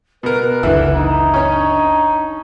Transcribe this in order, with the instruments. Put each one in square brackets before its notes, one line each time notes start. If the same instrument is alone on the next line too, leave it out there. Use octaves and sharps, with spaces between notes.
[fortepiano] B2 A#4 [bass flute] B4
[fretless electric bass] F#1 C#2 [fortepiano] D3 E3 E4
[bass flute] D4 [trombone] D#4
[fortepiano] C#4 C#5